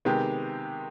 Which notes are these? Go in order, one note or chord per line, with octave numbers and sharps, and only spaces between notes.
C3 D#3 G#3 B3 G4